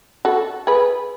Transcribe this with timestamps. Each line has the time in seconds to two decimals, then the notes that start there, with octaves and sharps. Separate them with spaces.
0.25 F#4 A4
0.67 G#4 B4